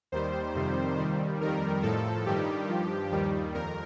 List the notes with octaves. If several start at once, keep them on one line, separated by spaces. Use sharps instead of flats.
D#2 D#3 G3 C5
F2 C3 D#3 G3
D#2 D#3 G3
F2 D#3 G3 A#4
A2 F3 A4
G2 D#3 G3 G4
G2 F3
D#2 D#3 G3
F2 A#4